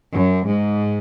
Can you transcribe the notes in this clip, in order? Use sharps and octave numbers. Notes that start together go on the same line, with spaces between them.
F#2
G#2